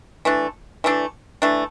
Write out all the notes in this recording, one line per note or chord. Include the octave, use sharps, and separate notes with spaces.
E3 A3 D4
E3 A3 D4
E3 A3 D4